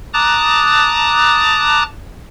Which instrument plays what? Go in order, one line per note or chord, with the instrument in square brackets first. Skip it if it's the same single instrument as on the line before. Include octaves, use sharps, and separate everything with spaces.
[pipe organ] A5 A#5 D6 D#6 F#6 A6